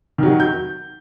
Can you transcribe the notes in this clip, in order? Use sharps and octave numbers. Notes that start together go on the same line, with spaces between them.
D#3 F#3
G6